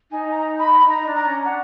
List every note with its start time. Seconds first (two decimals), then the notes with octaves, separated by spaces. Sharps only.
0.11 D#4 G#5
0.31 A#5
0.59 B5
0.87 D#4 A#5
1.06 D4
1.16 A#5
1.26 C#4
1.45 D4 F#5